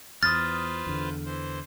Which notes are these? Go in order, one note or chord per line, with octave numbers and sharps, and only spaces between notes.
E2 F4 B4 C5 D#6 F6 A6
E2 D3
E3 C5